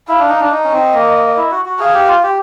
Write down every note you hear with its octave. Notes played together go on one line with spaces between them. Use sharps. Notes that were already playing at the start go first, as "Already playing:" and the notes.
E4 F5
D4
D#4
D4
D#4 D#5
C#4
C4
A#3
E4
F#4
F#4
G#4 F5
G4
F4
G4